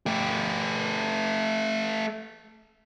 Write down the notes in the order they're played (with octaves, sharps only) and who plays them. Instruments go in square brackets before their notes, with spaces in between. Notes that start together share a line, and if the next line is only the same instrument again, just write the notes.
[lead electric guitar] A3 G4